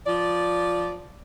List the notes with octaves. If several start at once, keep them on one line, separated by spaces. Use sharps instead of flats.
F3 D5